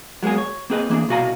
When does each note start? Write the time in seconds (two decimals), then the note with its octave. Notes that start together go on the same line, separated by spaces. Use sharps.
0.23 F#3 G#3 A#3 B3 G#4
0.38 C#5
0.70 A#3 C4 G#4 B4 D#5
0.90 E3 A#3 D4 G#4
1.09 C2 B2 F#4 F5 G#5 A#5